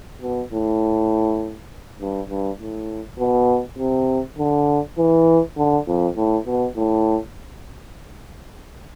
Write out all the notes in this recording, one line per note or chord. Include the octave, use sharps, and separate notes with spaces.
B2
A2
G2
G2
A2
B2
C3
D3
E3
D3
F2
A2
B2
A2